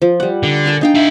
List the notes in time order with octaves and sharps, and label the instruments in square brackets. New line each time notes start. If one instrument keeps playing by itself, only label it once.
[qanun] F3
G3 F#5
[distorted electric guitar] D3
[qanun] A#4 G#5 A5
[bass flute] D4 [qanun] D#4 F5 G5
[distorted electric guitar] F4 E5